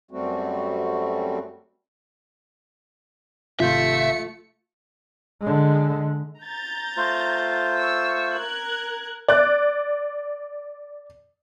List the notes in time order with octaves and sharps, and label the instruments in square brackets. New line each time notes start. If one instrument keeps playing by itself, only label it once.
[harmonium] F#2 G3 A3 C4 F#4
[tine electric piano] G#1 C3 G6 [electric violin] A3 C#7 [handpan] F4 [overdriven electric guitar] E5
[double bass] D3 G#3
[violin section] A#5 G6 A6
[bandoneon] A3 F4 C5
[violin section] C#6 E6
A#4 F#6 G#6
[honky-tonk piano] D5 F#6